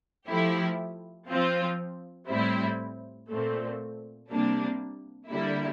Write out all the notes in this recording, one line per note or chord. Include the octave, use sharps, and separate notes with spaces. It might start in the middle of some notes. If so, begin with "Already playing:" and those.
F3 A3 E4 G4
F3 C4 F4
A2 G3 C4 E4
A#2 A3 C4
C3 G3 A#3 D4
D3 G3 A#3 E4